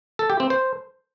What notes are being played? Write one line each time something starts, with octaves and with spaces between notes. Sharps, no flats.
A4
G4
C4
C5